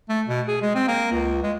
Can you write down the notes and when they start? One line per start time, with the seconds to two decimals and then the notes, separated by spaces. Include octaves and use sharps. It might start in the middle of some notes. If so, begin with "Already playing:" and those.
0.09 A3
0.28 B2
0.48 G#4
0.61 G#3
0.75 C4
0.88 A#3
1.12 C#2
1.43 G#3